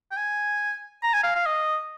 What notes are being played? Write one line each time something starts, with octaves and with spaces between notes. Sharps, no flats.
G5
G#5
A#5
G#5
F5
F5
D#5